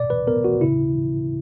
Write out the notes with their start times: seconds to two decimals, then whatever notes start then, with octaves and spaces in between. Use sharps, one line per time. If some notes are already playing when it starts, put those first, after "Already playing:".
Already playing: B2 D5
0.10 B4
0.27 B3 A#4
0.44 F#4
0.61 C#3 E4